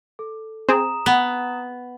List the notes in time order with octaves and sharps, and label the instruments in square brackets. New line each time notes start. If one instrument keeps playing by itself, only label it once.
[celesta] A4
[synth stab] C4 G#4 [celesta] A#5 D#6 E7
[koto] B3